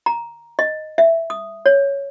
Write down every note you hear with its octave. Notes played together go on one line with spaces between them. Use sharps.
A#5
D#5
E5
D#6
C#5